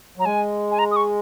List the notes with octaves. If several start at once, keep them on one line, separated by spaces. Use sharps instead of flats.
F#3 A#5
G#3 G#5
G#5
A#5
D#6
C#6